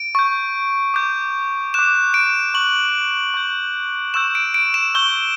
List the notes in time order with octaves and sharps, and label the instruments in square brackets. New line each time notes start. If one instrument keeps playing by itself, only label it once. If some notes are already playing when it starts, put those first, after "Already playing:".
Already playing: [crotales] D7
C#6 G6
D6 G6
D6 F#6 E7
D7
C#6 F#6 F#7
C#6 G6
C#6 E6 G6 E7
D7
D7
E7
C#6 E6 G6 G7